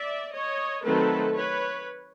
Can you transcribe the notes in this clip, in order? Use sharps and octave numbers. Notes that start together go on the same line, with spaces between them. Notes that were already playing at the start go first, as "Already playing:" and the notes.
Already playing: D5 E5
C#5 D#5
D#3 F#3 A3 C4 A4 B4
B4 C#5